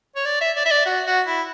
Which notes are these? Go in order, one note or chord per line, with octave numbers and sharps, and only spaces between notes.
C#5
D5
E5
D5
E5
D5
F#4
F#4
E4